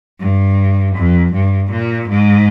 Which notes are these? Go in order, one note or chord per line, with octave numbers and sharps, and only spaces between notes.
G2
F2
G2
A#2
G#2